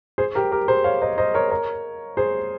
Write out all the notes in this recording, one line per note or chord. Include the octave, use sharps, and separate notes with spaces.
G#4 C5
G4 A#4
G4 A#4
G#4 C5
C#5 F5
C5 D#5
C5 D#5
A#4 C#5
A#4 C#5
G#4 C5